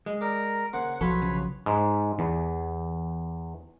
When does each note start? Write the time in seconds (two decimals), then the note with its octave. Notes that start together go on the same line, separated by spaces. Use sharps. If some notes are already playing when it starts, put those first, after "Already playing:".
0.06 G#3
0.21 A#4 D5 G5
0.73 C#3 A#3 C5 F#5
1.01 B1 F3 F#3 F4 F#4 A4 B4 C#5
1.22 C#3
1.66 G#2
2.19 E2